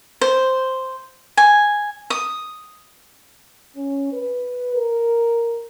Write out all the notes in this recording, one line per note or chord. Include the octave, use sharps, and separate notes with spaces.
C5
G#5
D#6
C#4
B4
A#4